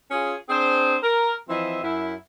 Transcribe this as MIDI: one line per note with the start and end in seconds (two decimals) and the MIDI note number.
0.11 0.34 61
0.11 0.34 65
0.11 0.34 68
0.49 0.96 60
0.49 0.96 62
0.49 0.96 68
0.49 0.96 72
1.02 1.33 70
1.49 1.82 52
1.49 1.82 53
1.49 1.82 60
1.49 1.82 75
1.49 1.82 76
1.82 2.14 42
1.82 2.14 64